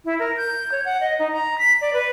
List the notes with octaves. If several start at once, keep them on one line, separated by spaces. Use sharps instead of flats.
E4
A#4
G6
C#5
F#5
D#5
D#4
A#5
B6
D5
B4